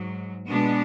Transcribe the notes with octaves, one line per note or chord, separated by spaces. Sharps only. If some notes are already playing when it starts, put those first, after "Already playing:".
Already playing: G#2 F#3
B2 G#3 B3 D4